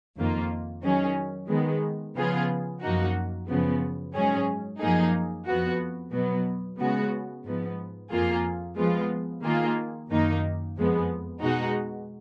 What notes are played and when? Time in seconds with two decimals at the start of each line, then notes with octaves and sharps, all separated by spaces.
0.16 F2 D#3 A#3 F4
0.83 D#3 F#3 C#4 G#4
1.49 D#3 G#3 B3
2.15 C#3 F3 B3 F4 G#4
2.81 F#2 F3 A#3 D#4 F#4
3.47 F#2 C#3 F3 B3
4.14 G#2 F#3 C#4 G#4
4.80 F#2 F3 A#3 D#4 G#4
5.46 F2 F3 B3 F#4
6.12 B2 F#3 B3
6.79 C#3 G#3 B3 F#4
7.44 G#2 F3 B3
8.11 F2 F3 A#3 F4 G#4
8.77 F3 G#3 B3 F4
9.43 D#3 A#3 F4 G#4
10.10 F#2 D#3 A#3 D#4
10.76 F2 F3 G#3 B3
11.42 B2 G#3 D#4 F#4